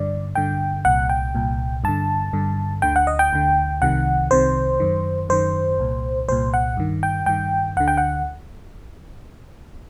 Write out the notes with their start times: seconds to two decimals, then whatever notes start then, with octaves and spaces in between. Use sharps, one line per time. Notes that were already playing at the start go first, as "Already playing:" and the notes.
Already playing: G2 D3 D5
0.35 G2 D3 G5
0.85 C2 A#2 F#5
1.09 G5
1.35 C2 A#2
1.84 G2 D3 A5
2.33 G2 D3
2.82 D2 D3 G5
2.96 F#5
3.07 D#5
3.19 G5
3.33 D2 D3
3.82 C2 C3 D#3 F#5
4.31 C2 C3 D#3 C5
4.80 F#2 D#3
5.29 F#2 D#3 C5
5.79 C2 A#2
6.28 C2 A#2 C5
6.54 F#5
6.77 G2 D#3
7.03 G5
7.26 G2 D#3 G5
7.77 D2 D3 F#5
7.88 G5
7.97 F#5